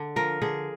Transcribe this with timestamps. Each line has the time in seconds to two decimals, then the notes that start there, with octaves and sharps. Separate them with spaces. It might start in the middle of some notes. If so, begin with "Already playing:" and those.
Already playing: D3
0.16 F3 A#4
0.42 D3 G#4